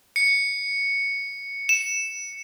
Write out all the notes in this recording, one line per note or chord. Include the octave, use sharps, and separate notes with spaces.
C#7
E7